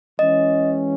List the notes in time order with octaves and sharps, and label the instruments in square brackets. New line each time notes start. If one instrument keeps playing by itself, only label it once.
[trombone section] E3 G#3 C#4 [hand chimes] D#5